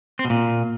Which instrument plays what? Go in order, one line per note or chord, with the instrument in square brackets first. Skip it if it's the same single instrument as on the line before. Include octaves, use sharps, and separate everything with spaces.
[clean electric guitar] C4
B2
A#2